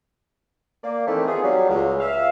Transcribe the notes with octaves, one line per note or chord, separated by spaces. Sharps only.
A#3 D5
D#3 E3 A3 C4
B3 C4 D#4 F4 G#4
F#3 G3
C#2
E5 F5